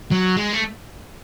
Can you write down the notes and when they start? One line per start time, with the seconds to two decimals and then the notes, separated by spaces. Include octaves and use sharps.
0.11 F#3
0.37 G#3
0.53 A3